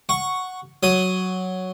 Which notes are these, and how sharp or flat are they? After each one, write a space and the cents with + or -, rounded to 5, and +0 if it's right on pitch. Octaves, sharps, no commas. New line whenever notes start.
F#5 +0 C#6 +0
F#3 +0 D#6 +0